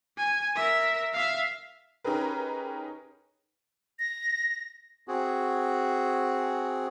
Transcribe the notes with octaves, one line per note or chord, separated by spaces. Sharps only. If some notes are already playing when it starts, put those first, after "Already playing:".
G#5
A#4 E5
E5 F5
C#4 D#4 G4 G#4 A#4 B4
A#6
C4 F#4 G#4